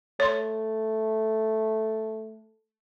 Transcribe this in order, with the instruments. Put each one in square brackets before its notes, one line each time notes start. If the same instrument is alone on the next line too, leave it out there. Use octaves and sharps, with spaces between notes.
[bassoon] A3 [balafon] C#5 C6